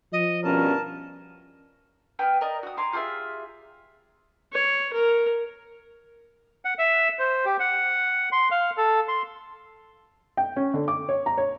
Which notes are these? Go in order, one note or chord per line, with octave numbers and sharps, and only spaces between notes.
F3 D#5
G2 B2 C#4 A#4 A5
B3 G5 G#5 F6
A#4 D5 D#5
F#4 D#6
G#5 A#5 C6 D6
F4 G4 G#4 E5
C#5
A#4
F#5
E5
C5
G4
F#5
C6
F5
A4
C6
G5
C#4
D3
D6
C#5
A#5
C#5